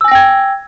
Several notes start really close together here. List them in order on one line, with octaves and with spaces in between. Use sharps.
E6 G#5 A#6 G5 G#6